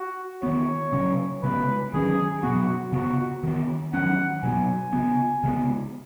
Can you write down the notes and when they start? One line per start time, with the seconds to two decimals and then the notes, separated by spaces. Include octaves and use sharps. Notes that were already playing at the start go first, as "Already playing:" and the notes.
Already playing: F#4
0.42 D#3 B3 C#5
0.92 C#3 F#3 C#4
1.42 C#3 G#3 B3 B4
1.94 D#3 F#3 C#4 G#4
2.43 B2 F#3 B3 F#4
2.92 C#3 B3 F#4
3.43 D#3 B3
3.93 D#3 F#3 C#4 F#5
4.43 B2 F#3 B3 G#5
4.93 C#3 B3
5.43 C#3 G#3 B3